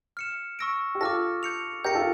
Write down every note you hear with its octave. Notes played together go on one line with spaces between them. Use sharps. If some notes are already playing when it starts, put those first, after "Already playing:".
F6 C#7 E7
C#6 E6 A#6 D7
G4
F4 A4 D6 F6 A#6
G6 C#7 F7
G4 A#4 G6 A#6 C#7
F4 A4